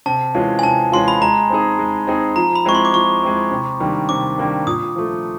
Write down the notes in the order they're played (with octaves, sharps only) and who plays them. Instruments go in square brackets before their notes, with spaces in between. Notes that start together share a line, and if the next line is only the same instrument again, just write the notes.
[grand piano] C3 [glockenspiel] A5
[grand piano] E3 G#3 C#4 F4
[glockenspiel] G#5
[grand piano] C3 [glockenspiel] A5
[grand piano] E3 G#3 C#4 F4 [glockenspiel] C6
[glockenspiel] B5
[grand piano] G#3 [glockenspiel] A#5
[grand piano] C4 D#4 G#4
G#3
C4 D#4 G#4
[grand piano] F3 [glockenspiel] A#5
[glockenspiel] B5
[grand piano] G#3 C4 E4 [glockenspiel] C#6
[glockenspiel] C6
D6
[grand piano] F3 [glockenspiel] C#6
[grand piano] G#3 C4 E4
C3
D#3 G3 A#3 D4
[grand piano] C3 [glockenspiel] D6
[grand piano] D#3 G3 A#3 D4
[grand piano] A#2 [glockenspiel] D#6
[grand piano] F3 A3